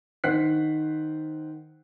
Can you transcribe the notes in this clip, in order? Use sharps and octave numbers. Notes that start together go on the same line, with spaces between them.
D#3 C5 F#5 F#6 B6 C7